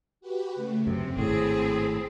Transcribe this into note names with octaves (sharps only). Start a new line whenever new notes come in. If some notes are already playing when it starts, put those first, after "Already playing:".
F#4 G4 B4
C#3 A3
F#2 C3 C4
G#1 A2 C4 G#4 A5 B5